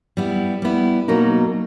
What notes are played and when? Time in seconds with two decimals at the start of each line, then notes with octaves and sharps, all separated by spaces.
0.17 G3 B3 E4
0.62 G3 B3 E4
1.08 B2 F#3 A#3 D#4